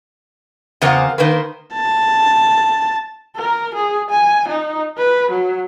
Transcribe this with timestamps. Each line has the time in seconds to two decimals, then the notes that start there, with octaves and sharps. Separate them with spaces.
0.81 E2 C#3 C4 F4 A#4 F#5
1.18 D#3 A#3 B4 C5
1.73 A5
3.36 A#4
3.74 G#4
4.10 G#5
4.48 D#4
4.98 B4
5.31 F#3